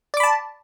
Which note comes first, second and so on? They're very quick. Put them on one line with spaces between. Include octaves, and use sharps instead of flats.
D5 D6 B5 A5